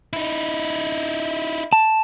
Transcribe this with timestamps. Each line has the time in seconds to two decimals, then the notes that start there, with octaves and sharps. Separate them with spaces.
0.13 D#4 E4
1.73 A5